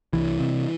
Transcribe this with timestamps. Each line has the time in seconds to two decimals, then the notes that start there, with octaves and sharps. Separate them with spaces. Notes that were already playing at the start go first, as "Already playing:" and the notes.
0.13 C2 E3
0.40 C3